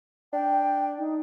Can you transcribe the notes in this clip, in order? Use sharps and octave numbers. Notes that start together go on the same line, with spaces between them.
D4 G5
D#4